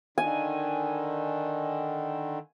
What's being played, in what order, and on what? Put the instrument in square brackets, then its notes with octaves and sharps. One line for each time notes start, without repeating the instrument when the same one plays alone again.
[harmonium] D3 D#3 [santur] G#5